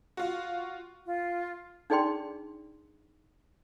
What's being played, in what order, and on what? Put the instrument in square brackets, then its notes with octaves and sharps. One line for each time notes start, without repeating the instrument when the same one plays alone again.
[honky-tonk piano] F4 F#4
[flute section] F4
[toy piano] D4 D#4 G#4 D5 G5 C6